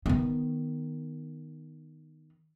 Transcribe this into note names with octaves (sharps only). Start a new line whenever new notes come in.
D#3 B3